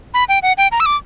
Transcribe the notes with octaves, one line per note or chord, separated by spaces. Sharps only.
B5
G5
F#5
G5
A#5
E6
D6